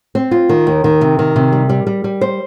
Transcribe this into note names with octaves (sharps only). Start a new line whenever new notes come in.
C4
F4
D#3
D#2
D#3
C3
D#3
C3
G3
G3
G3
G3
C5